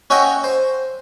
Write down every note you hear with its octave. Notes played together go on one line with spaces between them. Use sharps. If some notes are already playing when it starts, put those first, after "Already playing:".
C#4 F#4 D#5 E5 F#5 G5
C5